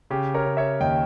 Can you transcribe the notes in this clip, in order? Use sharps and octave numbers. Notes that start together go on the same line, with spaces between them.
C#3 G4
A#4 C#5
C#3
C#5 E5
D#2 D#5 G5